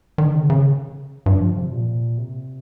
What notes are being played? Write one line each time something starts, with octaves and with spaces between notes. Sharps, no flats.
D#3
C#3
D#3
C#3
G2
F3
C3
A#2
C3